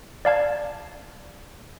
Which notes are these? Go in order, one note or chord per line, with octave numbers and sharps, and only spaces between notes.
D5 F5 A5 G#6